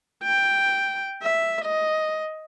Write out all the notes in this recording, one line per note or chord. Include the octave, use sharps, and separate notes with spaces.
G5
E5
D#5